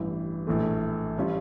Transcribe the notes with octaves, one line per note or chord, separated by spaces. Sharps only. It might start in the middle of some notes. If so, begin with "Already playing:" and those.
Already playing: A1 G2 E3
A#1 A2 E3 A3
E3 G3 C#4 F4